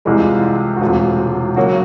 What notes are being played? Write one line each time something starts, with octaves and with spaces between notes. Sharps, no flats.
C2 C3 E3 G3 G#3 G#4
F4
F#4
E1 D2 C3 F4
C#3 F#3 A#3 F#4